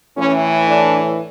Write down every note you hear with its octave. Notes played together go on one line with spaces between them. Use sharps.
A2 E3 C#4
D4